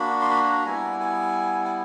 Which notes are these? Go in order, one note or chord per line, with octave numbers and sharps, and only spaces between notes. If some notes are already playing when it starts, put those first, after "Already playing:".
Already playing: A#3 D4 F#4 B5
C6
B5
B5
A#5
G3 B3 E4 G#5
G#5
G#5